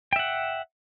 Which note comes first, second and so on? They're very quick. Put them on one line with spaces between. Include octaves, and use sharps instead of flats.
G5 E5 F#5